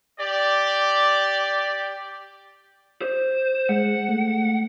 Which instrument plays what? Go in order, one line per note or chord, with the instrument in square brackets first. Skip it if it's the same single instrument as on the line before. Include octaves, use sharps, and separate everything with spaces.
[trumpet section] G4 D5
[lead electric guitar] C5
[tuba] G#3 [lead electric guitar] F#5
[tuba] A3